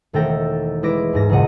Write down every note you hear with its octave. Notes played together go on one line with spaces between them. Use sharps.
E1 D#3 A3 A4 G5 A#6
G#3 E4 B4 D6 A#6 D7
D#2 G#2 A#6
F#1 C#2 A#2 D#5 F#5